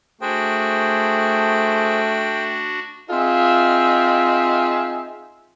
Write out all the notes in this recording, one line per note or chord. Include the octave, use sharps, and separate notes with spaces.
A3 D4 F#4 G#4 C5 G5
C4 D#4 F4 G#4 E5